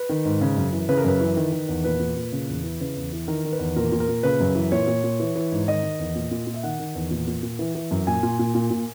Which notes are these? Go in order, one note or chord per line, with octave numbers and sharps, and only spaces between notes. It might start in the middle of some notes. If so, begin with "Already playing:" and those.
Already playing: B4
D#3
G#2
C#3
F#2
E3
C#3 B4
A#4
F#2 B4
E3
D#3
D#3
E2
A#2 B4
A#2
A#2
C#3
E2
E3
C#3 B4
E2
E3
D#3 A#4
D#3
B4
E2
A#2 A#4
A#2
A#4
A#2
C#3 B4
F#2
E3
A#2 C#5
A#2
A#2
E3
E3
G#2
D#3 D#5
D#3
E2
A#2
A#2
A#2
E5
D#3 F#5
D#3
E2
A#2
A#2
A#2
E3
E3
F#2
A#2 G#5
A#2
A#2
A#2
A#2